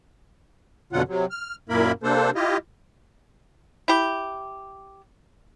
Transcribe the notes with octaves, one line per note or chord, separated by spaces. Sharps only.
F2 B2 D3 F#3 F4 F#5
C3 F#3
F6
F#2 A#2 A#3 E4 A#4 B5
C3 A#3 D4 A4 C5
E4 F4 G4 D#5
E4 G4